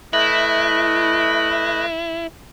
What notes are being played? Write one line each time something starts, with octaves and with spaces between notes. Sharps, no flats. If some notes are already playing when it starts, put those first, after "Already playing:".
A3 E4 B4 D#5